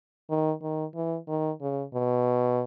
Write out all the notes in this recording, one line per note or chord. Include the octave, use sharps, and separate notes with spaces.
D#3
D#3
E3
D#3
C#3
B2